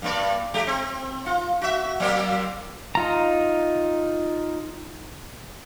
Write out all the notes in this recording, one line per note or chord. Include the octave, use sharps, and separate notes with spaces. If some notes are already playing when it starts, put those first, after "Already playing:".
G2 A#3 D5
G#3 G4
C4
F4
F#4 E5
F#3 A#3 C4
D#4 F4 A#5